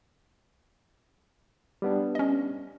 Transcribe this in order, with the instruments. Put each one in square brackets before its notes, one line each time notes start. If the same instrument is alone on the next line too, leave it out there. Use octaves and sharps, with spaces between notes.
[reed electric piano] G3 B3 D4
[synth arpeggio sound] C#4 D#5